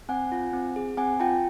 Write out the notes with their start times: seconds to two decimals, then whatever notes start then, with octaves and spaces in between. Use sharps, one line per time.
0.09 C4 F#5 G#5
0.32 F4
0.53 C4
0.76 G#4
0.97 C4 F#5 G#5
1.20 F4 G5 A5